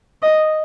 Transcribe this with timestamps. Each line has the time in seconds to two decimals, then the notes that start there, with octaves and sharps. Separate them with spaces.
0.22 D#5